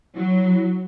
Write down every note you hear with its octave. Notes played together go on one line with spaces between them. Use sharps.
F#3 E4